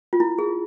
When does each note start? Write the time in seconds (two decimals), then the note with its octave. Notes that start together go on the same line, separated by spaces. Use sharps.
0.13 F4
0.20 E4
0.39 G#4